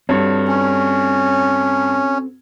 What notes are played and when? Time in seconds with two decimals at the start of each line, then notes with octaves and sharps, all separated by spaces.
0.09 G2 C4 F#4 A4 C#5
0.47 C#4